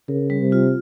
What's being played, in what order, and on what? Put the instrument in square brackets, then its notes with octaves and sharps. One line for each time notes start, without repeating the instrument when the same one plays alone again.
[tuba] C#3 [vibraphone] A#4
[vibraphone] G3
[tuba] C3
[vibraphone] F4